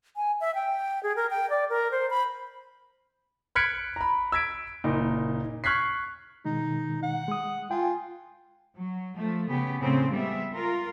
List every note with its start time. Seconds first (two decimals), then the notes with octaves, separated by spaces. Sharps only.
0.16 G#5
0.41 E5
0.55 G5
1.03 G#4
1.16 A#4
1.30 G5
1.50 D5
1.70 A#4
1.91 C5
2.10 B5
3.55 F6 F#6 G#6 B6 C#7 D7
3.96 A#5 B5
4.32 E6 G#6 B6 D7
4.84 F#1 A#2 D#4
5.64 C#6 F6 F#6 G#6 B6 C7
6.45 B2 D#3 G#3 D#4
7.03 F#5
7.28 G#3 D#6
7.71 F4 G5 G#5
8.76 F#3
9.16 F3 A3
9.50 C#3 B3 G4
9.82 A2 C#3 C4 C5
10.12 G3 G#3 B3 E5
10.53 F4 A#4